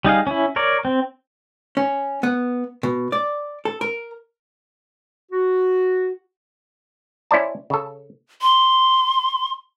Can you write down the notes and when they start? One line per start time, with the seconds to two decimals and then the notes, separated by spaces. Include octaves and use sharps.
0.05 G3 D#4 G#4 F5
0.27 C#4 E4
0.56 A#4 C#5 D5
0.85 C4
1.77 C#4
2.23 B3
2.83 B2
3.12 D5
3.65 A4
3.81 A#4
5.31 F#4
7.31 C#4 E4 C5 D5 A5
7.70 C#3 A4
8.41 C6